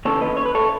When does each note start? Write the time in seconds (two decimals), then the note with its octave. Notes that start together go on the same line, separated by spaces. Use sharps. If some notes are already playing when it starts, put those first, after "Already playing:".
0.05 D#2 C#3 E3 A4 C#5
0.21 B4 D#5
0.37 C#5
0.46 B4
0.55 A4 C#5